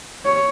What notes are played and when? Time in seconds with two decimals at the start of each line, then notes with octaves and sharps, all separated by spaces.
0.25 C#5